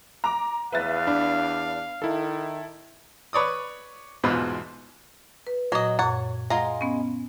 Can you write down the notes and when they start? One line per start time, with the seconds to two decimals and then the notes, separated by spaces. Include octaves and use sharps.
0.24 A#5 D6
0.72 E2 B4 E5 F5 A6
1.07 D4 B5
2.02 D#3 E4 A4
3.33 B4 C#5 D5 D#6
4.24 E2 G#2 B2 F4 B4 C5
5.47 B4
5.72 A#2 F#3 D#5
5.99 F#2 A#2 C#5 F#5
6.50 G#3 F4 F#5 A#5
6.81 B3 C#4